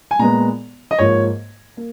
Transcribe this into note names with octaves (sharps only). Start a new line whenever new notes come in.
G#5
A#2 G#3 B3 A#5
D#5
G#2 F3 A#3 C#5
A#3